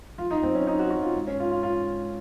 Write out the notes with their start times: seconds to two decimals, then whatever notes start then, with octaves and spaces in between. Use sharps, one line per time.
0.18 F2 F4
0.31 D#4
0.43 F#2 C4
0.55 C#4
0.67 D#4
0.79 F#4
0.90 F#4
1.03 F4
1.15 G#2
1.27 C#4
1.40 F4
1.51 F4
1.63 F4